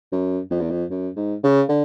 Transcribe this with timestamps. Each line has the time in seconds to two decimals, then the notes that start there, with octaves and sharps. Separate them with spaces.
0.12 F#2
0.51 F2
0.60 E2
0.70 F2
0.90 F#2
1.16 G#2
1.43 C#3
1.69 D3